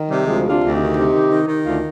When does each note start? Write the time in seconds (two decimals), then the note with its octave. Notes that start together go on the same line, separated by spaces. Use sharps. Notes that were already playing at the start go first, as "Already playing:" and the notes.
Already playing: D#3
0.09 C3 G3
0.26 D2 F3 G#3
0.44 C3
0.50 D4 F4
0.62 D2
0.72 D#4 G4
0.79 D#3
0.96 C3
1.14 D#3
1.31 D#3
1.47 D#3
1.65 D2 D4 F4